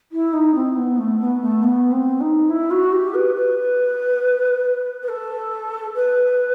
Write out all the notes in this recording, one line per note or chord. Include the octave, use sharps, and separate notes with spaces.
E4
D#4
C4
B3
A3
B3
A3
B3
C4
D#4
E4
F#4
G4
B4
B4
B4
A4
B4